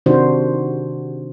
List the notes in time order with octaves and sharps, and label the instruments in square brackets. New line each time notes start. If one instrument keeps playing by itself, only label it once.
[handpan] C3 D#3 D4 F#4 C5